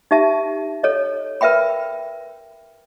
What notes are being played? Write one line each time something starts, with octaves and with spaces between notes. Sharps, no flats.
D#4 G4 E5 A5
A4 C#5 D#5
A#4 B4 E5 G5 B5